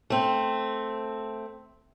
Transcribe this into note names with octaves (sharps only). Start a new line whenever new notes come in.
A3 C4